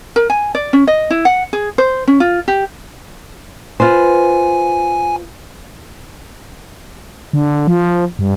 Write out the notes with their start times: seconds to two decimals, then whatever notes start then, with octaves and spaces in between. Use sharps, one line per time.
0.16 A#4
0.30 G#5
0.55 D5
0.73 C#4
0.87 D#5
1.10 E4
1.25 F#5
1.53 G#4
1.78 C5
2.08 C#4
2.20 F4
2.48 G4
3.80 F4 B4 C5 G#5
7.33 D3
7.67 F3
8.19 G2